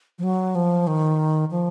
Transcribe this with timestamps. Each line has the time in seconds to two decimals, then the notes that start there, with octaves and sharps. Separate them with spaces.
0.19 F3
0.23 F#3
0.55 F3
0.87 D#3
1.51 F3